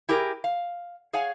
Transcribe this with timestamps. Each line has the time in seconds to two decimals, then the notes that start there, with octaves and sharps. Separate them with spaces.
0.09 E4 G4 G#4 A#4
0.44 F5
1.13 G#4 C#5 F5 F#5 G#5